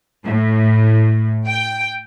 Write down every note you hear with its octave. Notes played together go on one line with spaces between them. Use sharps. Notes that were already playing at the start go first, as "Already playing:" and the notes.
A2
G5